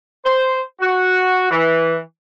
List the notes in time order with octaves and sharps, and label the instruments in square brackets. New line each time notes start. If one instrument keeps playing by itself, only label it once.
[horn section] C5
F#4
E3